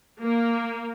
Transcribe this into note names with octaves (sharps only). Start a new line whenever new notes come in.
A#3